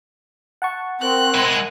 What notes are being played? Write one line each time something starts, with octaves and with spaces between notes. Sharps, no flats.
F#5 A5 C#6
C4 A#4 F#6
G#3 E4